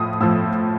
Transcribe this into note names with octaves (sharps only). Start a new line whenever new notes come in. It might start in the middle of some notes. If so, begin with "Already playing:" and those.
Already playing: A2 F3 D#6
A2 F3 E6